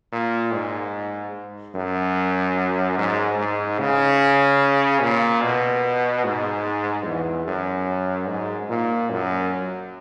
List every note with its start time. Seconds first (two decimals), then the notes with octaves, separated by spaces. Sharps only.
0.12 A#2
0.53 G#2
1.75 F#2
2.98 G#2
3.38 G#2
3.79 C#3
5.02 A#2
5.43 B2
6.24 G#2
7.06 E2
7.47 F#2
8.28 G#2
8.69 A#2
9.10 F#2